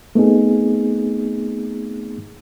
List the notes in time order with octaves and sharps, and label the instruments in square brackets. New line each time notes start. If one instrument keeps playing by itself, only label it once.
[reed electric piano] A3 B3 C4 D#4 G#4